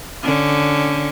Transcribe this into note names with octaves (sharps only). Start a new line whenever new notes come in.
D3 C#4